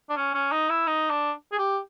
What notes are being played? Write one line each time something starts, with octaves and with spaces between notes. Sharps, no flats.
D4
C#4
C#4
D#4
E4
D#4
D4
G#4
G4